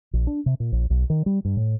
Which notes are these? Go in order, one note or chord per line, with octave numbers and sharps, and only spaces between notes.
A#1
D4
C3
A#2
A#1
B1
D#3
G3
G2
A2